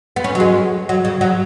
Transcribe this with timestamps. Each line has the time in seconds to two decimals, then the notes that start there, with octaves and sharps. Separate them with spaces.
0.16 B3
0.24 C#4
0.35 F#3
0.40 G#3
0.89 F#3
1.05 C#3
1.21 F#3